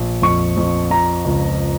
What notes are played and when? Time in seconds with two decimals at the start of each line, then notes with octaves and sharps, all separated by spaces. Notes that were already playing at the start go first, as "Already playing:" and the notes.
Already playing: A#1
0.22 F2 C#6
0.57 F2
0.90 F3 A#5
1.25 C#2